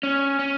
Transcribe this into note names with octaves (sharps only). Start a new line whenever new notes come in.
C#4
C#4